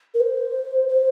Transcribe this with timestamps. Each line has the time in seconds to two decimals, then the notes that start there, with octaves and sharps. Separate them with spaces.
0.14 A#4
0.20 C5
0.88 C5